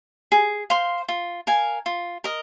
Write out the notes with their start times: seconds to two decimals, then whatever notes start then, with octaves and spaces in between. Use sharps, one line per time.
0.32 G#4
0.70 C5 F5 C6
1.08 F4
1.47 A#4 F5 G#5
1.86 F4
2.24 A#4 D#5